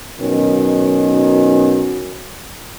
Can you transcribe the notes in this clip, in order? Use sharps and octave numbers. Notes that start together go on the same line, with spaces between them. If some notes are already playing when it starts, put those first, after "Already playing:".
B2 D#3 F#3 C#4